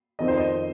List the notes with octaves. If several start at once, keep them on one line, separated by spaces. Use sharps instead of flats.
F2 D#3 C4 D#5
C5
D#5